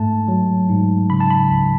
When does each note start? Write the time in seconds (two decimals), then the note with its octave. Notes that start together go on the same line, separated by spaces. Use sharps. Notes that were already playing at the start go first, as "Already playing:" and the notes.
Already playing: G#2 A3 A5
0.28 F#3
0.69 G#2
1.10 C#3 B5
1.20 A5
1.30 B5
1.50 C#2